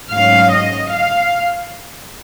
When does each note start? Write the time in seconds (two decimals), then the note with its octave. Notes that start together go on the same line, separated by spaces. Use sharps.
0.11 G#2 F#3 C#4 F5
0.51 D#5
0.91 F5